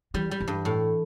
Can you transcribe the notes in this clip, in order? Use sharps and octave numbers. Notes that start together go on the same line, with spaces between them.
E3 G3
G3
E3
G2
A2